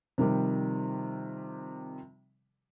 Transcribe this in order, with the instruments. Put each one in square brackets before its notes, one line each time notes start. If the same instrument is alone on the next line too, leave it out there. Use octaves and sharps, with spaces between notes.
[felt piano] C3 D#3 F3 G3